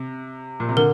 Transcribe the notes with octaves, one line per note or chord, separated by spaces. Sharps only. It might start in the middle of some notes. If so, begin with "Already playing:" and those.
Already playing: C3
A#2
C3
D3 A#4